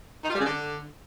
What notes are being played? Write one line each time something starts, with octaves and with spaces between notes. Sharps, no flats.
D#4
F4
G3
C#3
D3